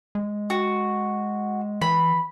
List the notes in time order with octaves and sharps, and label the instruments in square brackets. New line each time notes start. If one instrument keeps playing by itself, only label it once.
[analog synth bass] G#3
[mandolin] F#4
[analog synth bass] E3 [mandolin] B5